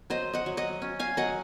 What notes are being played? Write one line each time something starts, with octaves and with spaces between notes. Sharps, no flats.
F#3 C5 D#5
D#5 F#5
F#3
D#5 F#5
C#4
F5 G#5
F#3 D#5 F#5